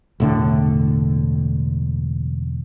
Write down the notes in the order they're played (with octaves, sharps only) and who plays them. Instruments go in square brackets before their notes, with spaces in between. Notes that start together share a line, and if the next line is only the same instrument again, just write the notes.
[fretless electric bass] E1 A2 D3